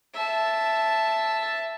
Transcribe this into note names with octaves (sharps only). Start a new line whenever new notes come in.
E5 A5